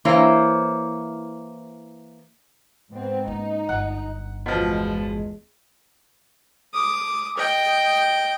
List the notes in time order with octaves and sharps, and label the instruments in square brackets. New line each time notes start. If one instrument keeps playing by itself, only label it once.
[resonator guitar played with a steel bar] E3 A#3 E4 C5 C#5
[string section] G#2 B3 C4
[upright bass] A#3 C#4 [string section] D#4
[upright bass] G1 [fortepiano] F#5
[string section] E2 G#3 [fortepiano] B2 F3
[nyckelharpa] D6 D#6
D#5 G5